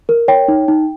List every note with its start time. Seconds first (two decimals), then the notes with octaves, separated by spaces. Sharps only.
0.09 A#4
0.28 C#5 G5
0.48 D#4
0.68 D#4